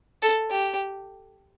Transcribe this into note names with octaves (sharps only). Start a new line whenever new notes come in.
A4
G4